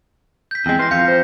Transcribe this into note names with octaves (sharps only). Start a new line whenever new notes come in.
G6 B6
E2 G#3 C4
E3 C6 F6 A#6
F2 F5 G6 B6 C#7
C5 A#6